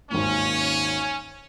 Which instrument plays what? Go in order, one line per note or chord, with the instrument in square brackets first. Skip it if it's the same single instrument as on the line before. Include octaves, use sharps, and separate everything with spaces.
[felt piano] G#1 D#2 A#2 [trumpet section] C#4